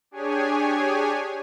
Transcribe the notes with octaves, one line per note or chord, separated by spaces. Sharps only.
D4 G4 G#4 C#5 G#5